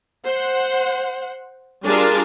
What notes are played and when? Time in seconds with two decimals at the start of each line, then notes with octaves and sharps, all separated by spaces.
0.25 C5 F#5
1.84 G3 D4 F4 G#4 A#4 A5